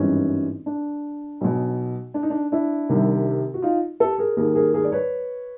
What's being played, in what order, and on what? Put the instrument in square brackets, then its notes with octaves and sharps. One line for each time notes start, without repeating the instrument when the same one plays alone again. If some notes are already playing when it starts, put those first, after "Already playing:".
Already playing: [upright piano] G#1 G2 E3 C#4 D#4
D4
B1 B2
D4
D#4
D4
D4 E4
C2 C3 D#3
F#4
D#4 F4
G4 A4
G#4 A#4
D#2 D#3 G#4 A#4
G#4 A#4
G#4 A#4
D5
B4 C#5